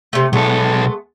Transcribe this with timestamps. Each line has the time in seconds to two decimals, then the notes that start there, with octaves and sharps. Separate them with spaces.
0.13 C3 A3
0.33 B1 G#3 A3 B3 A4